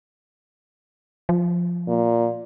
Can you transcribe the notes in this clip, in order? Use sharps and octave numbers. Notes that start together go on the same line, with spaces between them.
F3
A#2